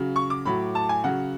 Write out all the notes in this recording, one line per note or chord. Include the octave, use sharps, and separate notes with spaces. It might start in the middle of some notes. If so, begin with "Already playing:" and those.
Already playing: C#3 F#3
C#6
D6
A2 F#3 B5
A5
G#5
C#3 F#3 F#5